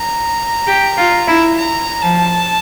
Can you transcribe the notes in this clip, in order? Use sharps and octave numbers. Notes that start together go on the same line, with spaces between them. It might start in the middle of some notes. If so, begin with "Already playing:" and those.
Already playing: A#5
G4
F4
E4
A#5
F3 A5